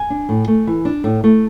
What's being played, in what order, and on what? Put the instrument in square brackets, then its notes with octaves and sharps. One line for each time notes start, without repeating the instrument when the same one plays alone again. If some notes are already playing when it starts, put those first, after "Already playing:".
Already playing: [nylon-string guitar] G#5
D4
A2
A3
E3
D4
A2
A3